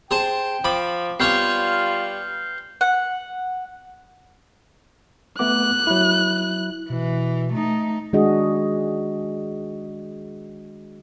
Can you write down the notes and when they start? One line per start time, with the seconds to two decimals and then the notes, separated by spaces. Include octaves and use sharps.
0.11 G#4 C5 G5 A5
0.64 F3 B5 D6
1.20 G3 B3 F4 C#5 G#5 F6 G6 C7
2.81 F#5
5.39 A3 B3 D6 F#6
5.87 F#3 E4
6.90 B2 E3
7.53 A3 D#4
8.13 D#3 G#3 D4 F#4 G#4 D#5